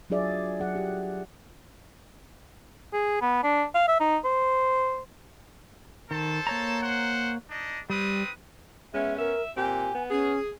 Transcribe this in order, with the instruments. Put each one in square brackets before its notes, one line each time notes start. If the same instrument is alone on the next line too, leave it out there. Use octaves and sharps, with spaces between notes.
[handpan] F#3 D4 F4 G#4 D5 E5
F#3 G#4 F#5
G4
[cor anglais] G#4
B3
D4
F5
E5
D#4
C5
[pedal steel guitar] D#3 [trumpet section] A4 C5 A5
[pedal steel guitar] A#3 C#5 A#5
[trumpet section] C5 F#5
D4 D#4 D#5
[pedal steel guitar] G3 [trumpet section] C4 B4 D#6
[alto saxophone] G#3 [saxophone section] B3 C#4 [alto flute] E5
[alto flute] A#4 [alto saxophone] E5
[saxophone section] A#2 C4 [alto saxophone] G4 [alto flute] G#5
[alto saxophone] B3
[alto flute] C#4 [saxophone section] G#4